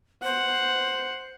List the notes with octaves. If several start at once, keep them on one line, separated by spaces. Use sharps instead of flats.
C5 F#5